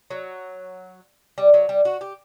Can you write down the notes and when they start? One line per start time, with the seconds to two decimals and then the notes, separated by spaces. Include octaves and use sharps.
0.10 F#3
1.38 G3
1.54 F#3
1.69 G3
1.85 F#4
2.01 G4